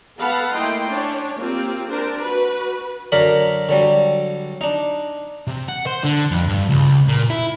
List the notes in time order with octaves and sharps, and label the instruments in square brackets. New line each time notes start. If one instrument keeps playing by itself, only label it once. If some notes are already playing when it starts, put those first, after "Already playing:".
[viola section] B3 A4 F5 F#5 B5
A3 A#3 E4 D#5 G5 C6
C#4 D4 C#5
A#3 C4 F4 G4
D4 A#4 C5
F#4 B4
[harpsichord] F#2 D3 A#4 D5 B5
D3 F#3 G3
D4 D#4
[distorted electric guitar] C3
F#5
C5
D3
F2
G2
C#2
A#2
E4